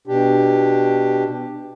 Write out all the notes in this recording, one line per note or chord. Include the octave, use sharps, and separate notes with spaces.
B2 D4 G4